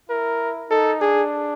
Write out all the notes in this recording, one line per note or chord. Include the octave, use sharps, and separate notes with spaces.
E4 A#4
D#4 A4
D4 G#4